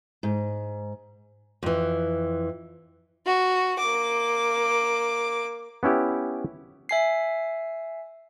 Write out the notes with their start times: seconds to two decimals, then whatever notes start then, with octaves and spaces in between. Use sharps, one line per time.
0.23 G#2
1.63 F2 E3
3.26 F#4
3.79 A#3 D6
5.83 B3 C#4 E4 G4
6.89 E5 G#5 C7